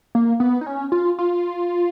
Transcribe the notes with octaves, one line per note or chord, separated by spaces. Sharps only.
A#3
B3
D#4
C#4
F4
F4